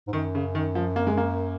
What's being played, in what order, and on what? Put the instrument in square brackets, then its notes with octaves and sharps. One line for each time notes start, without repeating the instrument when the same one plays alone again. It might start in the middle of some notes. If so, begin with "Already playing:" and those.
[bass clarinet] G#2
[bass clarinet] F#2 [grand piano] D#3
[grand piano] C#3
D#3
F3
A#3
G#3
A#3